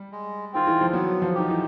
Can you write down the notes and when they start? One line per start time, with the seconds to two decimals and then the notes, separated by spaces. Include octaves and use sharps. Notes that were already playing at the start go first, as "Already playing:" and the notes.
Already playing: G3
0.12 G#3
0.53 D#3 C4 F4
0.67 E3
0.81 F3
0.93 F#3 B3
1.22 F3
1.35 D#3 D#4 G4
1.49 E3